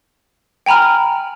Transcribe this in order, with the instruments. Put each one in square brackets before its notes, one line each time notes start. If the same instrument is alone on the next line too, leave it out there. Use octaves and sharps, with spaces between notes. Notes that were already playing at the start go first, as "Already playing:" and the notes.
[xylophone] G5 G#5 A#5 B5 F6